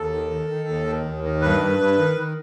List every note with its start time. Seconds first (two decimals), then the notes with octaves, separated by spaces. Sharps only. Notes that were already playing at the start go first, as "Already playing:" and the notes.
Already playing: D#2 A4
0.13 D#3
0.31 D#3
0.50 D#3
0.68 D#2
0.87 D#3
1.05 D#2
1.24 D#3
1.41 G2 B4
1.60 G2
1.79 G2
1.98 D#3
2.16 D#3